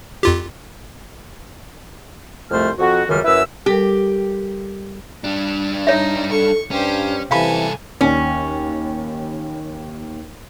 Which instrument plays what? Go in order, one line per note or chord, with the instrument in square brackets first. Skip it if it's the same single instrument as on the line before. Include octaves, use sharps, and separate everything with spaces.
[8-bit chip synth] F2 F4 G4
[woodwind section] C2 F2 A3 C5 F6
F2 F#4
C#2 F#2 D#3 G3 F6
F#2 E4 B4 E5 E6
[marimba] G3 A4 A#4 [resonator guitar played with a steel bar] G4
[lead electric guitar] G3 D4
[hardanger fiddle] D#4 [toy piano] C#5 E5
[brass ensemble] A4 [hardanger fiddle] C#6
[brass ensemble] G2 [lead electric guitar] C#4 [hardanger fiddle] G4 C5
[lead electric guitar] C2 A4 [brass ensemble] C3 E3 [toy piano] F5 B5 [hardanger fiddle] G#5
[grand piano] D#2 [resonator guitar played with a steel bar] C#4